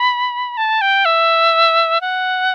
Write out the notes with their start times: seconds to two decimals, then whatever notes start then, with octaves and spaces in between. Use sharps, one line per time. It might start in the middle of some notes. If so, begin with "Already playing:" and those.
Already playing: B5
0.57 A5
0.81 G5
1.05 E5
2.01 F#5